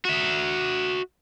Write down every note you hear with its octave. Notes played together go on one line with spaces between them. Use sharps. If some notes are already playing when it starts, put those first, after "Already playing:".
F#4 E5